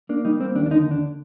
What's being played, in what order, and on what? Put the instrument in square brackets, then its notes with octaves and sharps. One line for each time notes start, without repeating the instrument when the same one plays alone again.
[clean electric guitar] A#3 D4
G3 D#4
A#3 C4
D#2 D4
D4
D3 D#4
D#2 D4